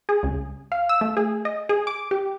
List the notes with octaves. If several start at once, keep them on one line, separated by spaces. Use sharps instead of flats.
G#4
C#2
F5
E6
A3
G#4
D#5
G#4
D6
G4